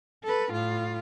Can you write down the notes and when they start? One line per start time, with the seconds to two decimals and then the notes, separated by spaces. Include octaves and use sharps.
0.23 A4 B4
0.52 A2 F4